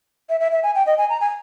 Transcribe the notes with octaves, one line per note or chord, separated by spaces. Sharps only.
E5
E5
E5
G#5
G5
D#5
G#5
A#5
G#5